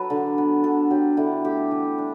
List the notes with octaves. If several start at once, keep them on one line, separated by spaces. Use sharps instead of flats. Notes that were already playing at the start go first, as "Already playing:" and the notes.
Already playing: F#3 A4 B4
D3
B3
D3 A4
F#3 G4
D3 E4
A3 G4
E3
D4